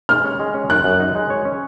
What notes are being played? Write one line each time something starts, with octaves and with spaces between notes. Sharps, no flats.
G#3 F6
C#4
G#3
C#4
F#2 F#6
F#2
D#4
G#3
C#5
C#4